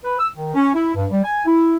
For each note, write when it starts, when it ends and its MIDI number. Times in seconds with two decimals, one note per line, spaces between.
0.04 0.15 71
0.19 0.29 88
0.35 0.53 51
0.54 0.71 61
0.74 0.94 64
0.95 1.05 43
1.10 1.22 55
1.24 1.45 80
1.45 1.77 64